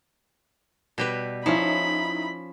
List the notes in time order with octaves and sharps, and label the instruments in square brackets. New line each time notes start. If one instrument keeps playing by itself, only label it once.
[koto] B2 G3 B4
[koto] F3 C#4 [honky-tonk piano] D#4 E4 [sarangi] B5